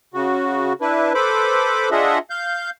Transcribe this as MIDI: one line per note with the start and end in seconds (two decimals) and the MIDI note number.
0.14 0.73 49
0.14 0.73 66
0.81 1.13 62
0.81 1.13 64
0.81 1.13 71
1.14 1.89 69
1.14 1.89 71
1.14 1.89 72
1.14 1.89 83
1.14 1.89 86
1.91 2.18 62
1.91 2.18 65
1.91 2.18 68
1.91 2.18 75
1.91 2.18 76
1.91 2.18 78
2.30 2.70 77
2.30 2.70 91